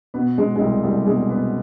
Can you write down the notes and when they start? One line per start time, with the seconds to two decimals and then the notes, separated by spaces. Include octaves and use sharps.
0.14 B2 B3
0.38 B2 G#3
0.56 G#3
0.60 C2 G3
0.83 C2 G3
1.07 B2 G#3
1.29 B2 B3